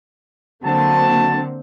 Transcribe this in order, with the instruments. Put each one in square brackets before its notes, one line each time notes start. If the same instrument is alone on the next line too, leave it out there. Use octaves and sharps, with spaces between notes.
[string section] D3 A#3 C4 [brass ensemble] F#3 F#4 A5